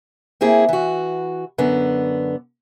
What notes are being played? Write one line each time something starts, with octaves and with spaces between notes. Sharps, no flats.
A#3 C4 E4 G#4
E3 F#4
F#2 D3 B3